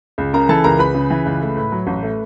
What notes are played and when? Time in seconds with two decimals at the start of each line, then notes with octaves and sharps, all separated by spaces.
0.18 C#2
0.34 C#3 A#4 A#5
0.49 E3 A4 A5
0.64 C#2 A#4 A#5
0.79 C#2 B4 B5
0.95 C#3
1.10 E3
1.26 C#2
1.42 A3
1.57 A2
1.72 F#3
1.87 A1
2.03 A3